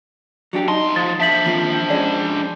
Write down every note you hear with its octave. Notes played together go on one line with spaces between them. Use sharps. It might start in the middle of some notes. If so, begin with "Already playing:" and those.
F#3 D4 G4
C2 D#4 A5 C6
F3 A6
D4 C5 E5 B6 F#7
D#2 F3 C4
F2 G#3 C#4 D5